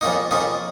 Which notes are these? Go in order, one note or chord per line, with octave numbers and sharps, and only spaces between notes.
F2 C#3 A#3 D#4
F2 C#3 A#3 D#4